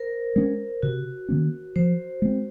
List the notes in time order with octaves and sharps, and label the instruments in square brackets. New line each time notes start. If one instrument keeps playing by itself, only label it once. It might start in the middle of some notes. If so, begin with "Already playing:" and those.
Already playing: [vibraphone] A#4 C5
[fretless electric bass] G#3 C#4
[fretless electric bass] C3 [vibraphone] F#4
[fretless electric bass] D#3 A#3 C#4
[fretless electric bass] F3 [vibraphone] C5
[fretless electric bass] G#3 C4